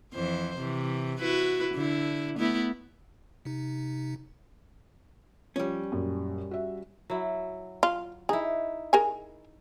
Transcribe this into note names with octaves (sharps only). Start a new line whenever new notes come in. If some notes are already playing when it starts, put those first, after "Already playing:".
F2 E3 C5
C3 E3
E4 F#4 B4
D3 E4
A3 B3 E4
C3 D#4
F3 G3 C#4
F#2 A#2
F#4 E5
F#3 E4
F4
D#4 E4 G#4
G#4 A#4 G#5